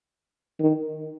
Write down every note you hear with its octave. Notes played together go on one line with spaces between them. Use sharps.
D#3